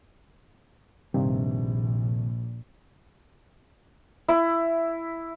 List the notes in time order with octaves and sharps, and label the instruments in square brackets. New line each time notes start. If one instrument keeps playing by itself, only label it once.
[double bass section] A#1 [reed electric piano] G2 C3 D#3
[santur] E4